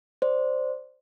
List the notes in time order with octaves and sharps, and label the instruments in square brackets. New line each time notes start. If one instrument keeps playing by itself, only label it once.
[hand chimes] C5 D5